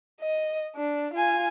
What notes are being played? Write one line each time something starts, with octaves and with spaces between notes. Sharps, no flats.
D#5
D4
F4 G#5